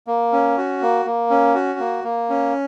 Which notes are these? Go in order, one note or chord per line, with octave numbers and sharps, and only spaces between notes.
A#3
C#4
F#4
A#3
A#3
C#4
F#4
A#3
A#3
C#4